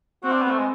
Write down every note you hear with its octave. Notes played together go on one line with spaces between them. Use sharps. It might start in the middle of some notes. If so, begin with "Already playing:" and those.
C4 F#4
D4
B3
A3
G#3